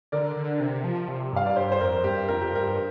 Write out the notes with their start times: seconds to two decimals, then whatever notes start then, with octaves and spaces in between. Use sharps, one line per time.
0.12 D3 A#4 D5
0.36 D3
0.60 C3
0.84 F3
1.08 C3
1.33 G2 F5
1.46 D5
1.56 G2 G4 C5
1.72 C5
1.81 F2 A#4
2.04 G2 G4
2.28 F2 A#4
2.41 G4
2.53 G2 A#4